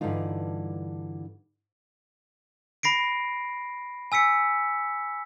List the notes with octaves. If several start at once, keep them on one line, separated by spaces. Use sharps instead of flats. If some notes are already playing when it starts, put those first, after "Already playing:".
G2 D3 E3 G3 D#4 F4
B5 A#6 C7 D7
G#5 E6 B6 C#7